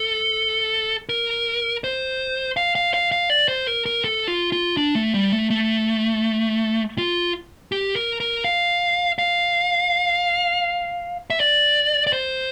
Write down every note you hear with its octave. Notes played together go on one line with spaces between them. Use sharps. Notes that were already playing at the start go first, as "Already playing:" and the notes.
Already playing: A4
A#4
C5
F5
F5
F5
F5
D5
C5
A#4
A#4
A4
F4
F4
D4
A3
G3
A3
A3
F4
G4
A#4
A#4
F5
F5
E5
D5
D5
C5